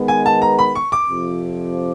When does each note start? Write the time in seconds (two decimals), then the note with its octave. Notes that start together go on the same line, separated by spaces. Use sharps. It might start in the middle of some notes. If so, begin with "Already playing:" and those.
Already playing: D#3 G#3 B3
0.08 G#5
0.26 A5
0.42 A#5
0.59 B5
0.75 C#6
0.92 D6
1.09 F2 C3 F3